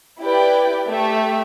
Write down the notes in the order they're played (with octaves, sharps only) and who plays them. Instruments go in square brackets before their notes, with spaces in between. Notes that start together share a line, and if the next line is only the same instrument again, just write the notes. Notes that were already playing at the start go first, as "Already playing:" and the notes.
[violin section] E4 G4 B4 D5 G5
A3 G4 E5